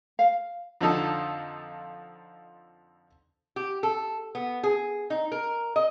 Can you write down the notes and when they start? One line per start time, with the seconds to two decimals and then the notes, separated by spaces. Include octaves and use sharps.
0.19 F5
0.81 F2 D3 F3 D#4 A4
3.56 G4
3.83 A4
4.35 B3
4.63 G#4
5.10 D#4
5.32 A#4
5.76 D#5